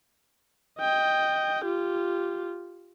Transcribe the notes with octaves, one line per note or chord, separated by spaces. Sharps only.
D#5 G5
F4 G4